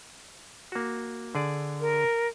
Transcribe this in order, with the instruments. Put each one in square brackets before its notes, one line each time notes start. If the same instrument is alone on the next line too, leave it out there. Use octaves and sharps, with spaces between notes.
[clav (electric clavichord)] A#3 F#4
D3 G#4 D5
[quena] A#4